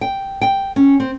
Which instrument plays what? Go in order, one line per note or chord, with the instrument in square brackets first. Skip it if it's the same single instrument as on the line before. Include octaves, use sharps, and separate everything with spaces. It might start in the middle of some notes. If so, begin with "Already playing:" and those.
[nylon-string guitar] G5
G5
C#4
C4